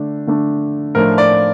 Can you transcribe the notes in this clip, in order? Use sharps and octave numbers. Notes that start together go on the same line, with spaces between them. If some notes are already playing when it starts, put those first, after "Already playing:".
Already playing: D3 A3 D4
D3 A3 D4
A2 F3 A3 D4 A#4
D5